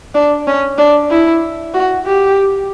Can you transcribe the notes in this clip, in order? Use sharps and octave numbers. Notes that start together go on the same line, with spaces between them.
D4
C#4
D4
E4
F#4
G4